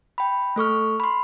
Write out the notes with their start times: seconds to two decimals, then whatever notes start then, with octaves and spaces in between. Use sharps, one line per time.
0.18 G5 B5
0.56 A3 A4 C#6 F6
1.00 B5 C6